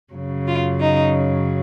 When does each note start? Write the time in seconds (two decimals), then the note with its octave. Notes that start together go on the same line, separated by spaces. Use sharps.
0.13 F#2 C#3 F#3
0.47 F4
0.80 D#4